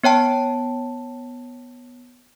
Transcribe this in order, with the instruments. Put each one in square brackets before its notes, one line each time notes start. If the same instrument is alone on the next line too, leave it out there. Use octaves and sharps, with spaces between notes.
[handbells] B3 C#5 G5 A5